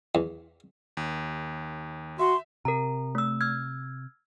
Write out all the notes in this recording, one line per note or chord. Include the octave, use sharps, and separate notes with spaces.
E2
D#2
F#4 E5 C6
C3 A#4 A#5
A3 E6
E6 F6 G#6